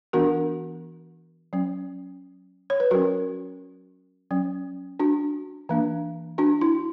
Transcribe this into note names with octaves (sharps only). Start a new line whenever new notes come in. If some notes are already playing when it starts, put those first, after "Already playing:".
E3 B3 D4 F#4 A#4
F#3 C#4
C#5
B4
F#3 C#4 F#4 A#4
F#3 C#4
D4 F#4
E3 A#3 D4
D4 F#4
E4